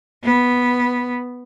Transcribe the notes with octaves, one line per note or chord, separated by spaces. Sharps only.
B3